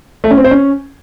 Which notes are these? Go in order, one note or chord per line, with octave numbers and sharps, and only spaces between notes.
A3
C#4
C4
C5
C#4